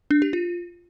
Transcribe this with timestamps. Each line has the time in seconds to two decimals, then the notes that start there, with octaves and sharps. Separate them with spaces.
0.11 D4
0.22 G4
0.33 F4